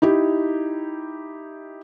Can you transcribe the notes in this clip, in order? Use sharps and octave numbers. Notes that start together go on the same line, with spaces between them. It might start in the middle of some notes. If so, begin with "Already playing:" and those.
D#4 E4 G4